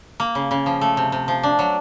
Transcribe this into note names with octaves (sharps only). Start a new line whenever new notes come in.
A#3
C#3
C#3
F3
A3
C3
C3
F3
D4
F#3